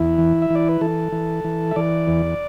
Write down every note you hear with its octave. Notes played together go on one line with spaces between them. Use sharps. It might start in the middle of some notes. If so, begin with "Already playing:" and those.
Already playing: E2 E4
E3
E5
E3 D5
B4
E3 A4
E3
E3
E5
E3 D5
E2